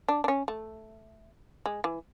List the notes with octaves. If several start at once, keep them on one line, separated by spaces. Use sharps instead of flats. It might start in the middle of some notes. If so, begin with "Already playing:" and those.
D4
D4
C#4
A3
G#3
E3